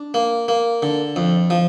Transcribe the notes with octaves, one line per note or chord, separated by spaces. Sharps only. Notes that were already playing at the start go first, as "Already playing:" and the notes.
Already playing: D4
A#3
A#3
D3
F2
F3